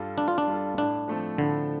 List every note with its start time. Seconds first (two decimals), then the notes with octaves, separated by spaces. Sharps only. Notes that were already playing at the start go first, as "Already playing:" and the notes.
Already playing: G2 G3 F4 A4
0.18 G2 D4
0.28 F4
0.38 D4
0.47 G3 F4 A4
0.78 A2 D4
1.08 F3 A3 C4 A4
1.38 A2 D3